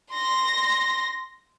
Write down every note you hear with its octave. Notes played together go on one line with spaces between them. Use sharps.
C6 A#6